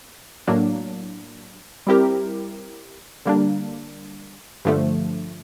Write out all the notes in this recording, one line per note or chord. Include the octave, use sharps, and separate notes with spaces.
A2 F#3 A#3 D4
G3 C4 E4 G4 A#4
D3 G3 A#3 D4
G2 D3 F3 A3